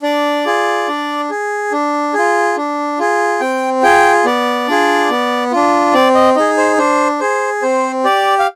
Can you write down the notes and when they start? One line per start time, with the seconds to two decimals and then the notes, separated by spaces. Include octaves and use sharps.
0.02 D4 D5
0.46 F4 G#4
0.88 D4
1.30 G#4
1.72 D4
2.14 F4 G#4
2.57 D4
2.99 F4 G#4
3.40 C4 G5
3.83 F4 G#4 G5
4.25 B3 D5
4.68 D4 F4 G#4
5.10 B3
5.52 D4 F4
5.94 C4 D5
6.15 D#5
6.36 D#4 G#4 D#5
6.57 C5
6.78 D4 C5
7.20 G#4 C5
7.62 C4 C5
8.04 G4 D5
8.39 F5